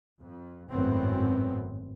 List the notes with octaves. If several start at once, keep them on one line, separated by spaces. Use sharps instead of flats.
F2
G#1 F#2 A2 B3 C4